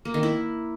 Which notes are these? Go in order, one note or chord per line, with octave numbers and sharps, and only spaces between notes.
A#3
D#3
E4